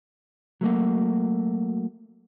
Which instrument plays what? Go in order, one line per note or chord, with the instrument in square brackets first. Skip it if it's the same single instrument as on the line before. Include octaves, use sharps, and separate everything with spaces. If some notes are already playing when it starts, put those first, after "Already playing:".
[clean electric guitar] F#3 A3 A#3 F#4